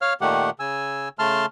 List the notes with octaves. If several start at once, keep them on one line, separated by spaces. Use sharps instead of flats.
C#5 F5 F6
A#2 D#3 A3 G4 F#5
C#3 G#5 E6
C#3 A3 A5 C6 F6